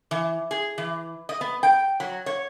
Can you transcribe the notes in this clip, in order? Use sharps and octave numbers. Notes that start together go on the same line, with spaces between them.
E3
G#4
E3
D#5
B3
G5
F#3
C#5